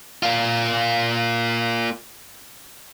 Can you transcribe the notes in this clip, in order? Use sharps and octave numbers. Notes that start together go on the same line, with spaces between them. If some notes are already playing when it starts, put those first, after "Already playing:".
A#3 F4